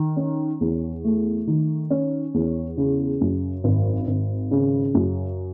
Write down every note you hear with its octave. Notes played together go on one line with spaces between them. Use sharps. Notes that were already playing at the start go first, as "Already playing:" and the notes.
Already playing: D#3
C#4
E2
A3
D#3
C#4
E2
C#3
F#2
G#1
G#1
C#3
F#2